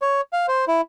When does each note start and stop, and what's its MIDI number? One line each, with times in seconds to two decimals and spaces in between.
0.02 0.21 73
0.33 0.46 77
0.48 0.65 72
0.68 0.81 64